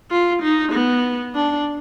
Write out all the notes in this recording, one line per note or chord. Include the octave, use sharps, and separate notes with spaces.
F4
D#4
B3
D4